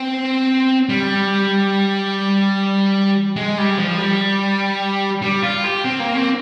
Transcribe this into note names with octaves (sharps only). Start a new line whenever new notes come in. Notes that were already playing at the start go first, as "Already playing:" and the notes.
Already playing: C4
G3
G#3
G3
F3
G3
G3
F4
G4
C4
A#3
C4